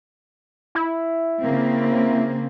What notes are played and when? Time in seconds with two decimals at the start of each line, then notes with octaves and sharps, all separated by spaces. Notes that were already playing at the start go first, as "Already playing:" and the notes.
0.75 E4
1.40 C#3 A#3 C4